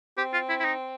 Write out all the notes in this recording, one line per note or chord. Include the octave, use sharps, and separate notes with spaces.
C4 G4
F4
E4
E4
D#4